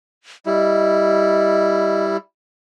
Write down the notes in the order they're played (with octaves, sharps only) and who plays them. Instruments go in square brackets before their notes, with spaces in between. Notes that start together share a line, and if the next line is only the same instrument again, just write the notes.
[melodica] G3 E4 [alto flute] D#5